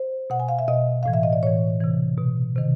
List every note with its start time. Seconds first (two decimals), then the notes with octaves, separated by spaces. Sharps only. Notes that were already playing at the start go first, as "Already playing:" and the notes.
Already playing: C5
0.30 B2 F#5
0.40 G#5
0.49 F5
0.59 E5
0.68 B2 D#5
1.03 A2 E3 F5
1.13 E5
1.23 D#5
1.33 D5
1.43 A2 E3 C#5
1.80 C3 E3
2.18 B2
2.56 C3 D#3